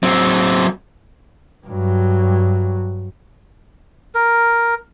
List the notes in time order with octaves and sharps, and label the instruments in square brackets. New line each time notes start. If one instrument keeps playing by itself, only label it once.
[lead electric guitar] F#3 C4
[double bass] G2 F#3
[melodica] A#4